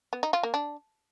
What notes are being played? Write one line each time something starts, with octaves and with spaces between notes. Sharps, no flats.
B3
D#4
F4
A#3
D4